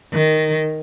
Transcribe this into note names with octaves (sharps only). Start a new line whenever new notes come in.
D#3